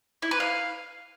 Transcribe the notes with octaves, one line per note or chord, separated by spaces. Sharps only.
E4
B4
F5